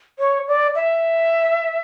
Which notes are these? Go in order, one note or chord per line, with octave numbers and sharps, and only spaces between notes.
C#5
D5
E5